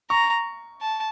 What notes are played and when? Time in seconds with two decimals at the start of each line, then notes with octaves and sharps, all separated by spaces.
0.10 A#5 C#6
0.81 A5